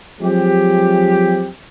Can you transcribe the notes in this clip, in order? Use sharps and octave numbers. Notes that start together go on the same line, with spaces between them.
F3 F#3 G#3 C4 G4